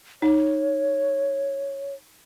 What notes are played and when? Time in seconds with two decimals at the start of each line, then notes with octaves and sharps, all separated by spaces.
0.22 D#4 C#5